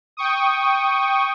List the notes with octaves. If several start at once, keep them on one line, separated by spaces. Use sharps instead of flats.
G5 C#6 D#6